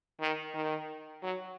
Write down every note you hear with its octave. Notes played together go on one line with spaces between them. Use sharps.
D#3
D#3
F#3